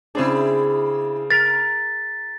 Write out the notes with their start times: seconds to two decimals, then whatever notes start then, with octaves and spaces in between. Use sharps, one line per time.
0.15 C#3 C4 D4 E4 G#4
1.30 A#4 A6 B6